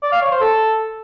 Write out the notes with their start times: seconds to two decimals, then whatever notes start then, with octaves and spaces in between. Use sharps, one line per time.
0.03 D5
0.12 F5
0.22 C#5
0.31 C5
0.40 A4